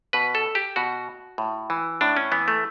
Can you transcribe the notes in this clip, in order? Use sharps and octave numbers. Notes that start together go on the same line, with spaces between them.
B2 B4
A4
G4
B2 F#4
A2
E3
A2 D4
C#4
E3 B3
A3